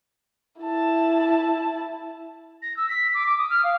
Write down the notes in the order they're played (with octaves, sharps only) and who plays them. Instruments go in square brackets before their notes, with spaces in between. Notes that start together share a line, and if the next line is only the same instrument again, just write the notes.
[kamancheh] E4 A5
[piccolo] A#6
E6
B6
D6
D6
D#6
F6
F5